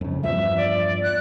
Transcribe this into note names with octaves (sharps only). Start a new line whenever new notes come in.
F2 C#3
E2 G2 F3 E5
D5
F#6